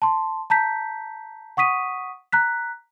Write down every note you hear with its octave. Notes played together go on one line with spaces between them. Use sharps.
A5 C6
A5 A#5 G6 B6
F#5 C#6 D#6 B6 D#7
A#5 F#6 B6